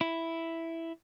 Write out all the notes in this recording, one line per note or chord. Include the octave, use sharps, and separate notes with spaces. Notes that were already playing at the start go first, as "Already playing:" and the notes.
E4